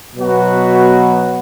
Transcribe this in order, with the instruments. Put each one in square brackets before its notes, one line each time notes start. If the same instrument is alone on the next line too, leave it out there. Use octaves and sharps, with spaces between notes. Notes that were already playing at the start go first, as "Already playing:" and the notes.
[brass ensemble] B2 F#3 B3 F#4 B4